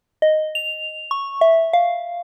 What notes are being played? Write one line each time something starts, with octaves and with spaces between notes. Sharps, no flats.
D#5
F7
C#6
E5
F5